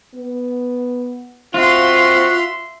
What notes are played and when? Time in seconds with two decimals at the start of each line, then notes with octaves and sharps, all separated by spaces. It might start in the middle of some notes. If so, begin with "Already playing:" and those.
0.15 B3
1.54 C4 F4 F#4 E5 C6